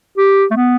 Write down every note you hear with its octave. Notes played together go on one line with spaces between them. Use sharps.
G4
A3
B3